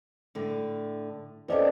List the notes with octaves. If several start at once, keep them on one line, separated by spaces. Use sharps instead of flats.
A2 D3
C4 C#4 A4 B4 D5 D#5